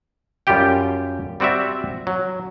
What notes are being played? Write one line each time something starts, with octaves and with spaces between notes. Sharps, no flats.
F#2 G3 F4 G4 G5
G3 C4 F#4 D5 E5
F#3